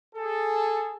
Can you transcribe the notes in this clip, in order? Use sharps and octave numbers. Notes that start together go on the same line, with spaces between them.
G#4 A4